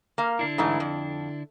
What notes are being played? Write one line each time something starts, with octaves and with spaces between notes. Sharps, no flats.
A#3 F5
D3 D4 E4
G#2 E3 A3
F2